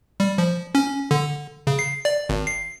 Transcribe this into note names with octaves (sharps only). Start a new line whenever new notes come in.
G3
F3
C#4
D3
C#3
C7
D5
G#1
C7